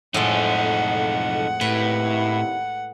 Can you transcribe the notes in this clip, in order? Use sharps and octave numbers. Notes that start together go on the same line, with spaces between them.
F2 A2 G#3 D#4 A4 F#5
D#2 A2 C3 E4 B4